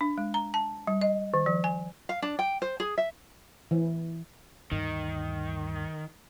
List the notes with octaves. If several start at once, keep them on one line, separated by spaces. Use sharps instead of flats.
D4
G#3
A#5
A5
G3
D#5
D#3
F3
G#5
F5
D4
G5
C5
G#4
E5
E3
D2 G2 D#3